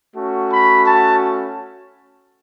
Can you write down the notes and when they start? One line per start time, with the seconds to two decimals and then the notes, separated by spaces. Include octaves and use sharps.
0.15 A3 C#4 F#4
0.51 B5
0.86 A5